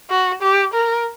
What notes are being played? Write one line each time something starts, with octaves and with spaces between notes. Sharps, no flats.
F#4
G4
A#4